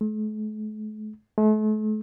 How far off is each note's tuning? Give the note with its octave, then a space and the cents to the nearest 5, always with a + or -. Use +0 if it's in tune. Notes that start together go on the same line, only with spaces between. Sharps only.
A3 -45
A3 -40